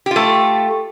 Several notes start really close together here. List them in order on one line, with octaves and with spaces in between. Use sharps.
G4 F4 A3